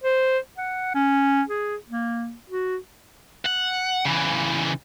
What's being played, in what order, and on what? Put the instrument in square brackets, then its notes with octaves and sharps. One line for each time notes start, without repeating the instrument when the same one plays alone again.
[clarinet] C5
F#5
C#4
G#4
A#3
F#4
[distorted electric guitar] F#5
C#3 E3